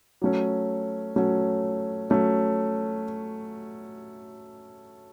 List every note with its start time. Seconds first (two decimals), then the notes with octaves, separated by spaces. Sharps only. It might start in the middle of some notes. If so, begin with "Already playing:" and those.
0.22 F#3 A3 C#4
1.16 F#3 A3 C#4
2.10 F#3 A3 C#4